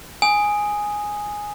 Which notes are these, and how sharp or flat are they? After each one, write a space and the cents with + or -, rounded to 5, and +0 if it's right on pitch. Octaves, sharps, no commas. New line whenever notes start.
G#5 +0 D#6 +0